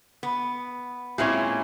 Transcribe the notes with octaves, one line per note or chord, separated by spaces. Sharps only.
B3
A#2 G#3 C4 C#4 E4 G#4